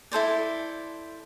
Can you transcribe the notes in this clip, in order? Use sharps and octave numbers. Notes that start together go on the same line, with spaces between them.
E4 A4 C5 D5